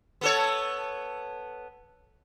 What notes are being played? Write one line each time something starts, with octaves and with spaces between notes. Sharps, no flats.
B3 A4 C#5